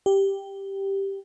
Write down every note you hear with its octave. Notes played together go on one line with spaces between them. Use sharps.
G4